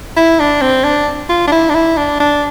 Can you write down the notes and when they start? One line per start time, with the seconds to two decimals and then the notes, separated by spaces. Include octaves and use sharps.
0.17 E4
0.40 D4
0.62 C4
0.84 D4
1.29 F4
1.47 D4
1.52 E4
1.70 D4
1.75 E4
1.97 D4
2.20 D4